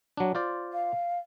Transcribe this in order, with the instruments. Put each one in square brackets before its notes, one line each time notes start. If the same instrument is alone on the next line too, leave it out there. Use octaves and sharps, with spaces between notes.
[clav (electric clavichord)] F#3 D4
F4 C5 D5
[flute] F5